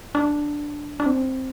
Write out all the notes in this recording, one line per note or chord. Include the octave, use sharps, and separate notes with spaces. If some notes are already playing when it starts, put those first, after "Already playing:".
D4
D4
C4